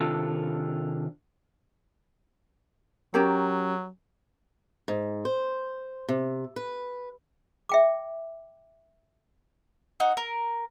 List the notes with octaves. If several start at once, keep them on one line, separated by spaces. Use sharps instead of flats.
C3 D#3 D4 F4 A4
F#3 C#4 G4 A#4
G#2
C5
C3
B4
E5 G5 D6
D#4 F#4
A#4